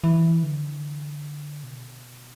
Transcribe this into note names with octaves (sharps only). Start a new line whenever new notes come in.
E3
D3
B2